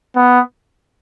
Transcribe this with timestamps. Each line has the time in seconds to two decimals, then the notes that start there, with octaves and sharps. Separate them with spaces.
0.16 B3